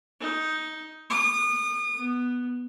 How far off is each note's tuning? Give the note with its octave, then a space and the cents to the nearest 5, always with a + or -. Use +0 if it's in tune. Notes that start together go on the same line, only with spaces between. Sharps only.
D#4 +10
D#6 -35
B3 +0